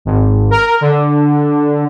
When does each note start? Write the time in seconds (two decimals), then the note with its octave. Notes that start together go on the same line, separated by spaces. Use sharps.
0.05 G#1
0.51 A#4
0.81 D3